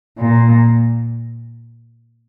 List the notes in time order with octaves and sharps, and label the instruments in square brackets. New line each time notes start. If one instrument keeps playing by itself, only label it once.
[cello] A#2